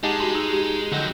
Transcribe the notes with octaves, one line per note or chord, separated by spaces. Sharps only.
G#3 D#4 G4 D#5 F#5 G#5 A5
F#4 C6
D#4 E6
G4
F2 D3 F#3 D#5 G6